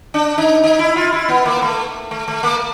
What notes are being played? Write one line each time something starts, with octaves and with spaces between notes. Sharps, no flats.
D4
D#4
D#4
E4
F4
E4
B3
A#3
A3
A3
A3
A#3